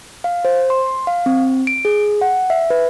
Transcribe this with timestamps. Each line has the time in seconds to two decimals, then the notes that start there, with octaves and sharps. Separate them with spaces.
0.24 F5
0.45 C5
0.70 C6
1.07 F5
1.26 C4
1.67 D7
1.85 G#4
2.21 F#5
2.50 E5
2.70 B4